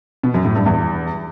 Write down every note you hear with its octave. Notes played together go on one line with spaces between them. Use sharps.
B2
F#2
A2
G2
E2